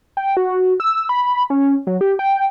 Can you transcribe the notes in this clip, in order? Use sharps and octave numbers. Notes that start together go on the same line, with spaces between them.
G5
F#4
E6
B5
C#4
F#3
G4
G5